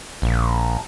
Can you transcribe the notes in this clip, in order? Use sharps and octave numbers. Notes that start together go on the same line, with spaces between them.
A#1